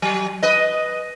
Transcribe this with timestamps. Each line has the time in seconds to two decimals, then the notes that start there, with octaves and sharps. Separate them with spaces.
0.02 F#3
0.43 B4 D#5